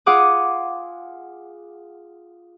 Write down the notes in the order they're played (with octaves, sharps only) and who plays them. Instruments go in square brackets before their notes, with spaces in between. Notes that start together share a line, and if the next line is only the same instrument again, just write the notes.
[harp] F4 G#4 F#5 D6 D#6